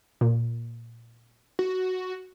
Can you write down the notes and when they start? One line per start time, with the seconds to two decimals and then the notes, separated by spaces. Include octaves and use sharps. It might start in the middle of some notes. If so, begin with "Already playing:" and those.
0.21 A#2
1.59 F#4